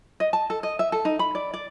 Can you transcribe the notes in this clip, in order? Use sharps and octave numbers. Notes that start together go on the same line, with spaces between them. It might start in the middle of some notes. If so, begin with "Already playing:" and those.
D#5
A5
A4
D#5
E5
A4
D#4
B5
D5
D5